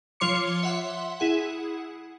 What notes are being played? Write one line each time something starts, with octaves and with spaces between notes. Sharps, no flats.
F3 F4 C#5 C6 D6 C#7
E5 F#5 C6
E4 G#4 F#5